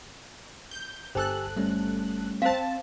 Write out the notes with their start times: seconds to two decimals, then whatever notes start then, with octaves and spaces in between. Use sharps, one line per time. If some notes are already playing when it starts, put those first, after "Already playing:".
0.71 G6
1.15 G1 G4 A4 C5 G#5 E6 F#6
1.57 G3 A3 C#4
2.42 C4 C5 F5 A5